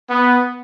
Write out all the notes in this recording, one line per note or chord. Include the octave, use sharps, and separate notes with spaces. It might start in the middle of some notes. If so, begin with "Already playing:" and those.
B3